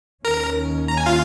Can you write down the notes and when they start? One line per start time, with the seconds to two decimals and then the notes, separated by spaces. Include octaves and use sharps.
0.25 D#2 D#3 C#4 A#4 A#5
0.88 A#5
0.97 G#5
1.06 F4 F5